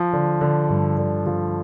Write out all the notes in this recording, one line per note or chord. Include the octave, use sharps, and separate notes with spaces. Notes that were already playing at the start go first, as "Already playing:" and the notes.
Already playing: F3
D3
D3
G2
D3
F3